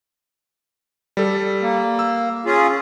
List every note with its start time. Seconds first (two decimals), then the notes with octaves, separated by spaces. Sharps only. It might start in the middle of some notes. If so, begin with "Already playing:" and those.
1.17 G3 A4
1.62 A#3
1.99 E6
2.46 C#4 F4 G#4